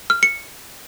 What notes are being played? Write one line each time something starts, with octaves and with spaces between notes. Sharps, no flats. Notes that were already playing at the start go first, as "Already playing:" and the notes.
F6
C#7